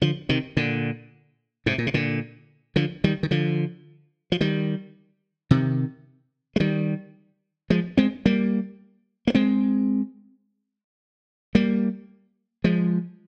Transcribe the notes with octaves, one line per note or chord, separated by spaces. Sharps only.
D3 F3
C3 D#3
A#2 D3
G#2 C3
A#2
C3
A#2 D3
D3 F3
D#3 G3
D#3
D3 F3
F3
D#3 G3
C3 D#3
G#3
D#3 G3
F3 G#3
G#3 C4
G3 A#3
A#3
G#3 C4
G3 A#3
F3 G#3